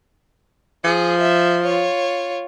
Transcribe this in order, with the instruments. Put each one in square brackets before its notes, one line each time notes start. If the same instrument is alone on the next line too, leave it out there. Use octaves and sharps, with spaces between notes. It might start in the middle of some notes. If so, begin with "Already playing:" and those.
[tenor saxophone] F3 [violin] G#4
[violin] E5
F4 C#5